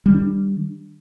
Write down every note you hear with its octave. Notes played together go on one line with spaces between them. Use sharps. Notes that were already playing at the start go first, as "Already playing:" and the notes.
D#3 G3 D4